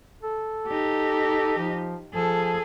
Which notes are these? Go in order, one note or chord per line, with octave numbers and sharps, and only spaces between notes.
A4
D#4 G4
F3
F3 G#4 A4